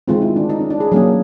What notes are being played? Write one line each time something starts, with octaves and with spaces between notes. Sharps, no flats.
D#3 G#3 C4 F4
E4
D4
D#4
C#4
D4
G#4
F#3 A#3 C#4 G#4